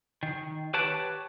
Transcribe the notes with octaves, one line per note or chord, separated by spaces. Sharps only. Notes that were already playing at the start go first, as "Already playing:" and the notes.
D#3
G4 B4 C#5 F#5 G5 A5